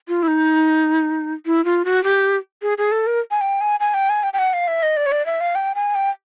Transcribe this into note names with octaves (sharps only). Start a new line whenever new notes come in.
F4
E4
D#4
E4
F4
F#4
G4
G#4
G#4
A4
A#4
G#5
G5
G#5
G#5
G5
G#5
G5
G5
F#5
F5
E5
D#5
D5
C#5
D5
E5
F5
G5
G#5
G5